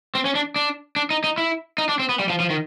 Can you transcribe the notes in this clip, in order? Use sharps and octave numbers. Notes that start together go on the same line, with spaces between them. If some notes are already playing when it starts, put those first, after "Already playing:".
C4
C#4
D4
D4
D4
D#4
D#4
E4
D#4
D4
C4
B3
G3
F3
F3
D#3